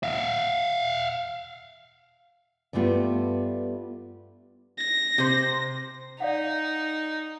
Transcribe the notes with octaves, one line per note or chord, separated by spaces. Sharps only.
E5 F5
G2 G3 A3 B3 F4
A#6
C3 C5
D#4 D5 F5 F#5